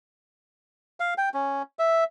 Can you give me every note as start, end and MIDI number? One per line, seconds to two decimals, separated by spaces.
1.00 1.14 77
1.18 1.29 79
1.34 1.62 61
1.79 2.04 76